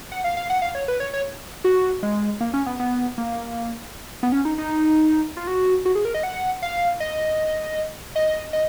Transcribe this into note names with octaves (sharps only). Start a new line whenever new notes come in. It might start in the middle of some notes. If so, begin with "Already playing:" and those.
F#5
F5
F5
F#5
F5
C#5
B4
C#5
C#5
F#4
G#3
A#3
C#4
B3
B3
A#3
B3
C#4
D#4
D#4
F4
F#4
F#4
G#4
A#4
D#5
F#5
F5
D#5
D#5
D#5